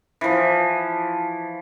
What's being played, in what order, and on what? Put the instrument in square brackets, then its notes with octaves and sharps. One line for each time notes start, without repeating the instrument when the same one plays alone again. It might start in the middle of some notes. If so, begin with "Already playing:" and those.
[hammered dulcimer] E3 F3